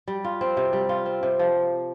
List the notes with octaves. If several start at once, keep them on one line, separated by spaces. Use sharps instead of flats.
G3
F4
C4
C3
G3
F4
C4
C3
F3